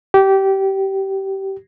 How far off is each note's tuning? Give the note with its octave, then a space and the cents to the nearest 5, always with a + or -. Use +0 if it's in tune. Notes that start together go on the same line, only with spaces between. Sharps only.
G4 -20